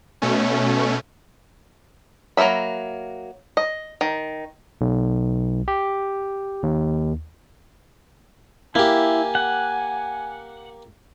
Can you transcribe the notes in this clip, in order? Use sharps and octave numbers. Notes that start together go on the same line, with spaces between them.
B2 A3 C#4
F#3 A#3 A4 E5 B5
D#5
D#3
B1
G4
D#2
A#3 E4 G4 G#5
F#5